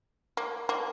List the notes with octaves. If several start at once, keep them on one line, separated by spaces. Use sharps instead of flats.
A#3
A#3